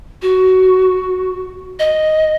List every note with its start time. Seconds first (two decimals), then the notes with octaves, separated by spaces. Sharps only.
0.22 F#4
1.79 D#5